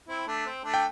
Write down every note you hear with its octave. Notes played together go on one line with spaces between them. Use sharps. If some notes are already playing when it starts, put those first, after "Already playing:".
C4 E4
A3 D4
C4
A3 D4
G5